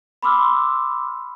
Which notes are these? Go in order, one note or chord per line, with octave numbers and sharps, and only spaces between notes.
B5 C6 D6 E6 F6